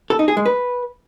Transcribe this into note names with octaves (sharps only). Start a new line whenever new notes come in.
A4
D#4
G#4
G#3
B4